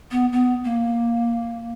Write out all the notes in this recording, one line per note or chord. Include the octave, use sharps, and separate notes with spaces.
B3
B3
A#3